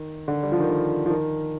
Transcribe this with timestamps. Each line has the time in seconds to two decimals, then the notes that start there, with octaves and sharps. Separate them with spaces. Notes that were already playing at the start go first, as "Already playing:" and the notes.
Already playing: D#3
0.28 D3
0.43 G3
0.52 F3
0.60 D#3
0.69 D3
1.06 F3
1.10 D#3